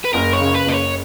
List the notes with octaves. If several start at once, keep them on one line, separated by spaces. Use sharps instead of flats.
B4
F#1 A#4
C#5
C#3
B4
F#1 D#5
C#5